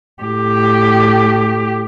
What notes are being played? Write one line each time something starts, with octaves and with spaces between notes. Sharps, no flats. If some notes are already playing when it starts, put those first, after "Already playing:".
A2 G4